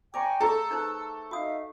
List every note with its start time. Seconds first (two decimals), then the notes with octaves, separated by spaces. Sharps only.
0.14 D5 G5 G#5 A#5 C#6 D6
0.41 A3 G#4 A4 A#5 C#6 E6
0.71 D#4 B4 C5
1.31 D#4 F#4 E5 F5 D#6